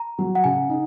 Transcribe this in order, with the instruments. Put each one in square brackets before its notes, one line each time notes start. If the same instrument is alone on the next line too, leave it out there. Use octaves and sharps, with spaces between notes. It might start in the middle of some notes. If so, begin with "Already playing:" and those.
Already playing: [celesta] A#5
[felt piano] F#3
[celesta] F#5
[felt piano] C#3 [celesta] G#5
[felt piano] D#4